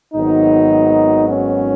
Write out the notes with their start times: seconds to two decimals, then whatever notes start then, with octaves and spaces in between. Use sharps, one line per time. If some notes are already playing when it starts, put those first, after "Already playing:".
0.14 G#1 G#2 D#3 F#3 B3 D#4
1.29 C#4